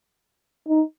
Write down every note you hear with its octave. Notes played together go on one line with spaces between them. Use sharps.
D#4